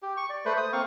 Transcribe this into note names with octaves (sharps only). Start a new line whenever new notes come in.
G4
C#6
D5
A3 B4 C5
C5 D#6
A#3 C4 F5 C#6